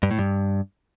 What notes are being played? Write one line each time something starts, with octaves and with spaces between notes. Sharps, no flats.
G2
A2
G2